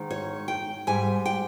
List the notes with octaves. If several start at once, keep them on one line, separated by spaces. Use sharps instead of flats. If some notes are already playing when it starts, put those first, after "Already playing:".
Already playing: G#2 D#3
C#5
G5
G#2 G3 G#5
G5